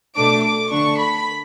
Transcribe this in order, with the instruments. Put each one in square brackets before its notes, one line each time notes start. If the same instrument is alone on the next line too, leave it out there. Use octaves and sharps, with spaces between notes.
[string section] B2 A3 D4 D6
D6
D3 A3 D4 C#6
B5